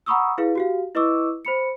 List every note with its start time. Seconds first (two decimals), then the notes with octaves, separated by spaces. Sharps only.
0.06 F#5 A#5 B5 C#6 D#6 E6
0.38 E4 G#4 B4 F5
0.55 F#4 G4 F5
0.95 E4 B4 D#5 C#6 D6 E6
1.45 C5 B5 C#7